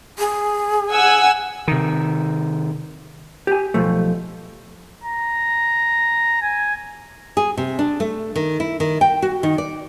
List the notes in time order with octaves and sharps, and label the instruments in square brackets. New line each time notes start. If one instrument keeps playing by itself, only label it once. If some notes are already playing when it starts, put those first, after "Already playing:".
[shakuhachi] G#4
[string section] F#5 G#5 E6
[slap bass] C3 D#3
[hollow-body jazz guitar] G4 G#5
B1 F3 A3
[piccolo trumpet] A#5
G#5
[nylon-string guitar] G#4
C3
D4
A3
D#3
E4
D#3
G5
F#4
D#3
D5